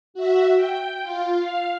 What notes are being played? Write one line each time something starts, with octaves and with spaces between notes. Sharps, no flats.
F#4 E5
G5
F4
F5